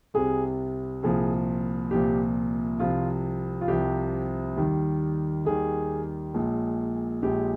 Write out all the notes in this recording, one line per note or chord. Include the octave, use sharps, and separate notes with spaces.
C2 C3 G3 G#4
C2 A#2 F3 G#4
C2 A#2 F3 G4
C2 C3 F3 F4
F4
C2 C3 F3 G4
D#2 D#3 G3
D#2 D#3 G3 G#4
A#1 A#2 G#3
A#1 A#2 G#3 G4